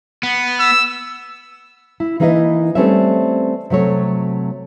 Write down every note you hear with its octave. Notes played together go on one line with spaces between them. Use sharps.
B3
E6
E4
E3 A#3 D#4 E4 B4 D#5
G3 A3 C4 C#4 B4 E5
C3 F#3 A3 C#5